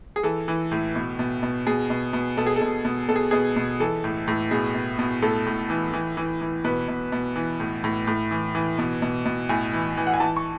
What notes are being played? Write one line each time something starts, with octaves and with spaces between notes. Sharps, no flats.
G#4
E3 A4
E3
A2
B2
B2
B2
B2 G#4
B2
B2
B2 A4
G#4
A4
B2
B2
B2 A4
G#4
B2 G#4
B2
E3 A4
A2
A2
B2 G#4
B2
B2
A2 A4
A2
E3
E3
E3
E3
B2 B4
B2
B2
E3
A2
A2
A2
E3
E3
B2
B2
B2
A2 G#5
E3
E3
F#5
G#5
E3 A5
C#6